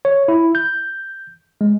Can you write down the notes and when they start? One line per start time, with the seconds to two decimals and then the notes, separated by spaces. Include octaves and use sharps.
0.05 C#5
0.28 E4
0.55 G6
1.61 G#3